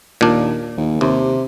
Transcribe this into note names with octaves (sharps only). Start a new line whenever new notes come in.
D#2 A#2 D4
D#2
D#2 C3